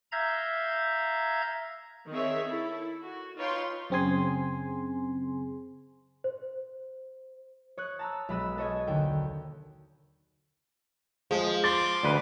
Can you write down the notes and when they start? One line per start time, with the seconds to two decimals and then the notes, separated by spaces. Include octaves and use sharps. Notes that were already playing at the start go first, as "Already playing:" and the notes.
0.12 E5 F5 A#5 G6 G#6
2.10 D#3 C4 G#4 C#5 E5
2.47 E4 A4
3.02 F#4
3.37 D#4 F4 B4 C#5 G5 C6
3.90 F#2 C#3 C4 G#4 G#5 C6
6.24 C5
7.77 C#5 D#6 F#6
7.99 A5 A#5 E6
8.29 B1 G#3 B5 D#6 E6
8.58 A4 C#5 D#5 G#5
8.87 D#2 D3 G5
11.31 F3 G#3
11.64 C6 D6 A6
12.03 D2 B4